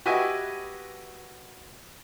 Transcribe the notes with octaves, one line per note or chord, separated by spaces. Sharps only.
F#4 G4 B4 D#5 E5 G#5